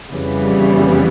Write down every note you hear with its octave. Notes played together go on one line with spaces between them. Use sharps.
F2 C#3 E3 G3 B3